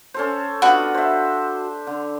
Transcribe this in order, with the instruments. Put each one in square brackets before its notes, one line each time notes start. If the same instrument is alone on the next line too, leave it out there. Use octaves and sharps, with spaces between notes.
[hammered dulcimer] C#4 A4 C5
[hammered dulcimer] B3 D4 F4 [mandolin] F#4
[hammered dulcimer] C5 E5
D3